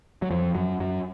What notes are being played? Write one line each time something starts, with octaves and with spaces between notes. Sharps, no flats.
F#3
F2 F3
F#2 F#3
F#2 F#3